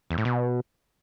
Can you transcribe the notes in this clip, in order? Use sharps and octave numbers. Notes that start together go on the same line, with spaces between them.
E2
A2
B2